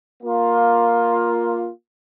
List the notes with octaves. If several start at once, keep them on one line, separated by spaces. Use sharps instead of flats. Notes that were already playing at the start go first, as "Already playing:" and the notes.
A#3 F4